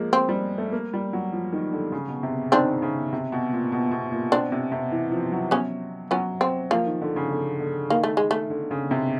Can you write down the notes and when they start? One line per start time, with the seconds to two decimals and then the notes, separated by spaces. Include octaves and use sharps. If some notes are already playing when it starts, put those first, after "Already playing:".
Already playing: F3 G#3 A#3
0.13 C4
0.29 G3
0.58 A3
0.72 A#3
0.93 G3
1.13 F#3
1.33 F3
1.53 D#3
1.73 D3
1.92 C#3
2.08 B2
2.23 C3
2.52 D#3 C4 D4
2.82 C#3
3.13 C3
3.32 B2
3.53 A#2
3.72 B2
3.91 B2
4.12 A#2
4.32 B2 C4 D4
4.52 C3
4.72 C3
4.92 E3
5.11 F3
5.32 F#3
5.51 B3 C#4
6.11 F#3 B3 C#4
6.41 C4
6.71 F3 A#3
6.86 D#3
7.01 D3
7.16 C#3
7.31 D3
7.60 D3
7.90 D#3 A#3
8.04 A3
8.17 G#3
8.31 A3
8.50 D3
8.71 C#3
8.91 C3